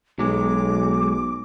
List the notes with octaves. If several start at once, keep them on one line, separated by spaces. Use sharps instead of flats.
B1 F#3 G#3 D6